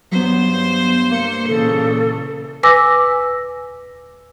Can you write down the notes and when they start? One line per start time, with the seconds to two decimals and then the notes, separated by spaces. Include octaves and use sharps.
0.12 G2 F#3 B3 C5
1.11 A#3 C#7
1.49 A#2 C#3 E3 A4
2.63 B4 G#5 D6 E6 A#6